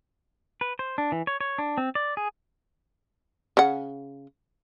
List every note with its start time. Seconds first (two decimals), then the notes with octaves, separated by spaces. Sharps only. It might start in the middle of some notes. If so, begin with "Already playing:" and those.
0.61 B4
0.79 C5
0.98 D4
1.12 E3
1.27 C#5
1.41 C#5
1.58 D4
1.78 C4
1.95 D5
2.17 G#4
3.57 C#3 F#5